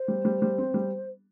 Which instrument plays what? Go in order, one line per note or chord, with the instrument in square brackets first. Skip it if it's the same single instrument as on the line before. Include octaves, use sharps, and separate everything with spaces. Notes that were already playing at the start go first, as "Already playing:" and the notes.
Already playing: [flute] C5
[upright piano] G3
G3
G3
C4
G3